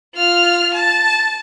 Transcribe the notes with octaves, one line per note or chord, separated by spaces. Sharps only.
F4 F6
A5